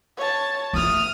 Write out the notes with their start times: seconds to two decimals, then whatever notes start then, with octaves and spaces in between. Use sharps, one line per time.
0.17 C#5 A5
0.73 G1 A3 D#6 F6